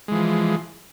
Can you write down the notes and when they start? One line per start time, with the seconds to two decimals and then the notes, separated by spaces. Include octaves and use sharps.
0.08 G#3
0.12 E3
0.15 F3